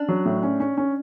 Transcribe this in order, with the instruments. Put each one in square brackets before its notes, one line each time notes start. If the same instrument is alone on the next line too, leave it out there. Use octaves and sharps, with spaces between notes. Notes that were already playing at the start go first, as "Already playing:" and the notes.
Already playing: [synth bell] C#4 D4 D5
[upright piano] F#3
A2
C#4
C#4
C#4